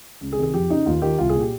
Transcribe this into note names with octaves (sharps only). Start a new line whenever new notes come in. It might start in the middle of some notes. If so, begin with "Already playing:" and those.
C#2
G#4
C3 D#3
G#4
F2 G4
C#3 D#4
D#2 F4
D#3 G4
C2 F4
G#4
A#2
G4